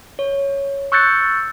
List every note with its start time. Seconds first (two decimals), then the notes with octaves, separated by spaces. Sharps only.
0.19 C#5
0.92 C#6 E6 F#6 G6 A6 C#7